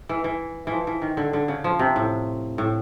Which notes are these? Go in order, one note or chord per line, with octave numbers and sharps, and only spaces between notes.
E3
E3
E3 F3
E3
D#3
D3
D3
C#3
F3
C3
A2
A2